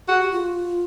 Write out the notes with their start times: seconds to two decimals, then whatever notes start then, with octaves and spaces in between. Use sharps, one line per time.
0.08 F#4 G#4
0.20 G4
0.32 F4